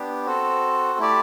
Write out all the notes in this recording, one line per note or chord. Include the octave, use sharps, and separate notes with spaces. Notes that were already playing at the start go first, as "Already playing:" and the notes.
Already playing: B3 D4 G4
C4 F#4 A4
A3 E4 G4 D5